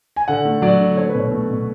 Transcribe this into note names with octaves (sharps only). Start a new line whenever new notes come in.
G#5
D3 F#5
A3
F#3 D5
D3
A3 C#5
B2 B4
C#5
A3
B2